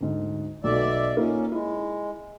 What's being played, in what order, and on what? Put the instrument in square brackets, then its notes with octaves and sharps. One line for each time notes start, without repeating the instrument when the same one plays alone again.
[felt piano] D2 G#2
[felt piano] B1 A3 [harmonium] B2 D5 E5
[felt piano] A#3 D#4 F4 [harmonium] C#4
[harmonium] G#3 [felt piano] E4